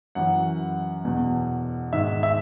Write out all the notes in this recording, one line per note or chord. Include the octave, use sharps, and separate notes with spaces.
F#2 E3 F#5
E2 B2
G#2 D#3 E5
E5